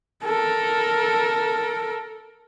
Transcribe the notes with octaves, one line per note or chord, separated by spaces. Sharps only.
A4 A#4